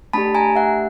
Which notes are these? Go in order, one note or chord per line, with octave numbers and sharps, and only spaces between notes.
A3 D4 G4 A5 B5
G#5 A#5
E5 F#5